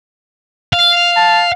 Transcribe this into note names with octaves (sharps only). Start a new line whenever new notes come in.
F5
A5